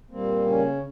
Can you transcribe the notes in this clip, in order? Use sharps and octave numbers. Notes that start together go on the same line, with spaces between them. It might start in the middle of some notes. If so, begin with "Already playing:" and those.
A#2 G3 A#3 C4
C#3 C#4